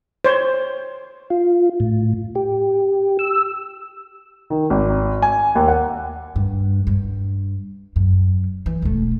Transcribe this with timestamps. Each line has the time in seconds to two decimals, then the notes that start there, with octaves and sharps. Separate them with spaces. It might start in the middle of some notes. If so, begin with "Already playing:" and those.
0.25 C5 C#5
1.30 F4
1.80 A2
2.36 G4
3.19 E6
4.50 D#3
4.70 G#1
5.22 G#5
5.55 D#2
5.68 F#5
6.36 G2
6.87 G2
7.96 F#2
8.66 E3
8.82 E1 A3